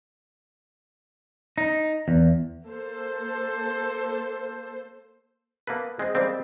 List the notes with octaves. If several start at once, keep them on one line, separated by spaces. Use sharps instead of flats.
D#4
E2
A#3 A4 C5
A#3 B3 A4 B4
G#3 C4 G#4
G3 G#3 A#3 C4